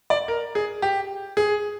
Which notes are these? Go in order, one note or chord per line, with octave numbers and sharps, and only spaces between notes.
D5
A#4
G#4
G4
G#4